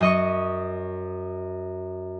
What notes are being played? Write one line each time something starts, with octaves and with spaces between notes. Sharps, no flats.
F#2 D#5 C#6